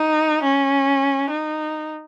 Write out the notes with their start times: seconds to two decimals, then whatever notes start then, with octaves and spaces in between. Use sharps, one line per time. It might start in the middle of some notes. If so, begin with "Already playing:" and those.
Already playing: D#4
0.43 C#4
1.30 D#4